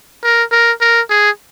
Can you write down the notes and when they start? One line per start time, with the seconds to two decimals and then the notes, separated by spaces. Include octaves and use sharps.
0.23 A#4
0.52 A#4
0.81 A#4
1.10 G#4